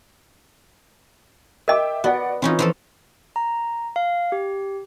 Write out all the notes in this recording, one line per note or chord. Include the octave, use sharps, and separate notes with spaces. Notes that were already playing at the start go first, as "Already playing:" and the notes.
A#4 D#5 E5 G5 D6
B3 F#4 D5 F#5
E3 C4 C#4 D#4 F4
E3 F3 A4
A#5
F5
G4